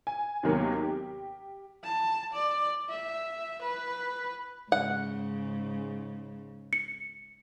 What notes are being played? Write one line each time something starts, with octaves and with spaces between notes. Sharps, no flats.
G#5
D#2 C3 D#3 F#3 A#3 B3
G4
A5
D5
E5
B4
G#2 C#3 F#5
C#7